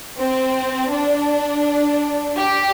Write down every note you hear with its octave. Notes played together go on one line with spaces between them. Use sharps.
C4
D4
G4